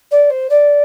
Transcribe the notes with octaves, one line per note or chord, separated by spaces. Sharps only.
D5
C5
D5